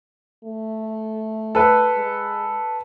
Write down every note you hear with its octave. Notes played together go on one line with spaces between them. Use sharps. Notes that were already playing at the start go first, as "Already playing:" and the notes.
A3
A4 B4
G#3